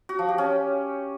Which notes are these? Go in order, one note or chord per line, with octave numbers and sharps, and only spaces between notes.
F#4
F3
G4
C#4